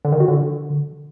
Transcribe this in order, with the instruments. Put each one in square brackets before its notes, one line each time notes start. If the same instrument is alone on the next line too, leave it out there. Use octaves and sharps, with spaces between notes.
[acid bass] D3
D#3
F#4
D3